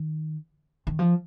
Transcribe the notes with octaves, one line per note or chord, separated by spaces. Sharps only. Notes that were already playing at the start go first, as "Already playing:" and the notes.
Already playing: D#3
D#3
F3